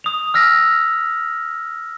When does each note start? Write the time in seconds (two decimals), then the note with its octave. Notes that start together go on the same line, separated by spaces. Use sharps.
0.04 D#6 F7
0.34 E6 F6 A#6 B6